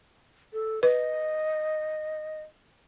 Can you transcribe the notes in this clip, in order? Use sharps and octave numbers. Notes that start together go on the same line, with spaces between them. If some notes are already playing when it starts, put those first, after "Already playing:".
A4
B4 D#5